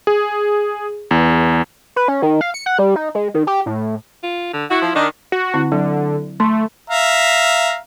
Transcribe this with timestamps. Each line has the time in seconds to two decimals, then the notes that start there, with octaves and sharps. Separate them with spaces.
0.07 G#4
1.11 E2
1.96 B4
2.08 C#4
2.22 D#3
2.41 F5
2.54 C#7
2.66 F#5
2.79 G3
2.96 D#4
3.15 G#3
3.34 D#3
3.47 G4
3.66 A2
4.23 F4
4.53 D3
4.70 E4 F#4
4.82 F3
4.95 D#3 D4
5.32 F#4
5.54 D3 C4 E4
5.72 D3 F#3
6.40 A3 C6
6.90 E5 F5 A#5